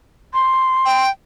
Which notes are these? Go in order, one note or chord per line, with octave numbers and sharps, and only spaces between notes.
C6
G5